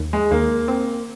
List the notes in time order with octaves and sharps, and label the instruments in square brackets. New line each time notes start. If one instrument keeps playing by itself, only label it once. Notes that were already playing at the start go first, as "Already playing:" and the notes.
Already playing: [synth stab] D#2
[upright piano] G#3
[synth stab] D#2 [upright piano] A#3
[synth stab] C4